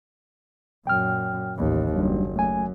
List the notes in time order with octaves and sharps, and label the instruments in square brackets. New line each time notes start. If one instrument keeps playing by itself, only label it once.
[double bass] F#2 A#2 [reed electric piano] G5 F6
[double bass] A1 D#2
[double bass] F#1 [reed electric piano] G3 D4
[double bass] F#2 [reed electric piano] A3 G#5